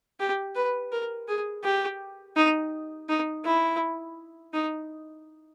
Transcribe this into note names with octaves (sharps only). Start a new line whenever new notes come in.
G4
B4
A#4
G#4
G4
D#4
D#4
E4
D#4